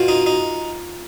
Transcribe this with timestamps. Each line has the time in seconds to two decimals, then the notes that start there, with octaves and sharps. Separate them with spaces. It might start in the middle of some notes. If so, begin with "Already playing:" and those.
Already playing: B2 F4
0.08 D#4
0.26 D#4